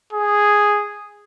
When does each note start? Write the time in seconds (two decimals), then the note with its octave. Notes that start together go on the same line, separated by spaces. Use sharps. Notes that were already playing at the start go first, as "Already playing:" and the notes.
0.13 G#4